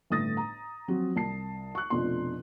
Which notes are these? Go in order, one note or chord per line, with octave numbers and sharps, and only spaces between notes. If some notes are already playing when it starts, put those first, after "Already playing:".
G1 A2 D#6 A6 A#6
A#5
F3 F#3 C4 F4 F#4
C2 A5 C7
C#6 F#6
F1 F2 B2 F3 D4 C6